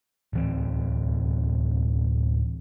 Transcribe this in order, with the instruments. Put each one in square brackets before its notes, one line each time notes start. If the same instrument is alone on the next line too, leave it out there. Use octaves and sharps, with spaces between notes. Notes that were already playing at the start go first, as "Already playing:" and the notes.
[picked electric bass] D1 E3 C4